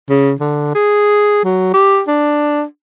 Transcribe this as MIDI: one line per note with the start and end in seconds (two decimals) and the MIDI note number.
0.10 0.32 49
0.40 0.72 50
0.75 1.43 68
1.44 1.71 54
1.74 2.02 67
2.08 2.64 62